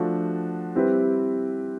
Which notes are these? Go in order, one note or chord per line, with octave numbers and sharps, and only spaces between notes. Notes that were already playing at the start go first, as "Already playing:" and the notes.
Already playing: F3 A3 D4 F#4 A4
G3 C4 E4 G4 B4